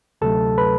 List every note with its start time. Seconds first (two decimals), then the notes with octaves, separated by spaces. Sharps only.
0.21 D2 C3 F#3 A3 A4 A5
0.58 B4 B5